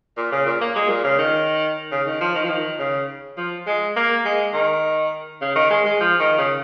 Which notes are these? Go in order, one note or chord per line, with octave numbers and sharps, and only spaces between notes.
A#2
C#3
A#2
A#3
G#3
A#2
C#3
D#3
C#3
D#3
F3
D#3
F3
D#3
C#3
F3
G#3
A#3
G#3
D#3
C#3
D#3
G#3
G#3
F3
D#3
C#3